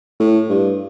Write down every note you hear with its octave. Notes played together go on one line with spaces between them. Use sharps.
A2
G2